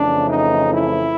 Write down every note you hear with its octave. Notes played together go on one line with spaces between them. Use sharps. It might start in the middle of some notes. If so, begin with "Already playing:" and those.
Already playing: F2 C#3 E3 A3 D4
D#4
E4